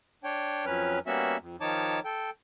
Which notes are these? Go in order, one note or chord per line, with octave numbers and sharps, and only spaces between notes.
D4 C#5 G5
F2 F#3 C#4 B4 F6
G3 A#3 B3 C#4 F#4 E5
F2
D#3 F3 D#4 C#5 A5 D6
A4 G5